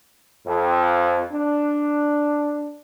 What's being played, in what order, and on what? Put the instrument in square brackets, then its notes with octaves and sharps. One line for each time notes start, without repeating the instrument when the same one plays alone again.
[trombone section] F2
D4